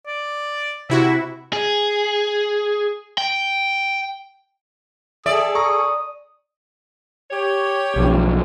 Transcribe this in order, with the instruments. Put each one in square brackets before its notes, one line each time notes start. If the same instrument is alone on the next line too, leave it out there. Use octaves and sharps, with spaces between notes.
[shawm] D5
[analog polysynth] C3 E4 F#4 [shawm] E5
[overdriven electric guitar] G#4
G5
[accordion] G#4 A4 [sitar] D5 [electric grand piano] E5 [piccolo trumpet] D#6
[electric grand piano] A#5 C#6 [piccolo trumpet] D#6
[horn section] G4 C#5
[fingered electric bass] B1 F3